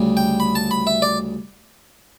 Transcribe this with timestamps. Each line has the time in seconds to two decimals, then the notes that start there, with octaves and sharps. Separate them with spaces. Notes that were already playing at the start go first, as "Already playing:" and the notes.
Already playing: D2 C#3 G3
0.17 G5
0.40 B5
0.55 A5
0.71 B5
0.87 E5
1.02 D5